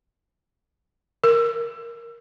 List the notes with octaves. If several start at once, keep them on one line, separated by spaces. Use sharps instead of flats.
A#4